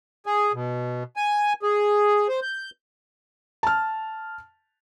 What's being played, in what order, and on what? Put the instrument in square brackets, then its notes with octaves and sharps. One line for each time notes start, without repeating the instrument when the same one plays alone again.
[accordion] G#4
B2
G#5
G#4
C5
G6
[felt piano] A5 F6